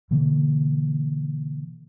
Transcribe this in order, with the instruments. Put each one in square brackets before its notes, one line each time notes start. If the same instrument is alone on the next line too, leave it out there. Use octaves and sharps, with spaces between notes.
[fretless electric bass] B2 D3 E3 A#3